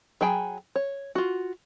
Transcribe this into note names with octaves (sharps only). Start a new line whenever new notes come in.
F#3 G#4 G5 G#5 B5
C#5
F4 F#4